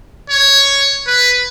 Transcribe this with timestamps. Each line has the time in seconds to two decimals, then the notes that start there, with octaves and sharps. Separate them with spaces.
0.30 C#5
1.07 B4